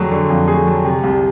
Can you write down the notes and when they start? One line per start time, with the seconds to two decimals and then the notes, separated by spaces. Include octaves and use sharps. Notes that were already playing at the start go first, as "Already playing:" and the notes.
Already playing: F2 D3 F#3 A3 G#4
0.11 D3
0.30 F2
0.48 A3 G#4
0.67 F#3
0.84 C3
1.03 C2